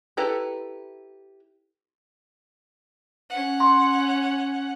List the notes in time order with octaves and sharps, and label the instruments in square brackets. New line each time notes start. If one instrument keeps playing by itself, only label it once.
[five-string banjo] E4 G4 A4 B4 A#5
[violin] C#4 F#5
[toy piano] C6